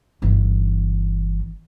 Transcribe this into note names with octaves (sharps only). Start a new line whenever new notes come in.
G1 E3